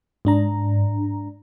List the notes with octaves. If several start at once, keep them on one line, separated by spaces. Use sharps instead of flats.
G#2 D4 A#5